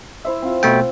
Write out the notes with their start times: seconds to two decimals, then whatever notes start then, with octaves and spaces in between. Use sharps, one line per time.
0.25 E4 C5 E5
0.42 C4 F4
0.63 B2 A3 G5